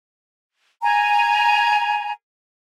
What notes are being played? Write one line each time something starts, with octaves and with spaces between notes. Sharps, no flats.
G#5 A#5